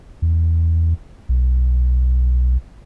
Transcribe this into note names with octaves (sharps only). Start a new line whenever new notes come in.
E2
B1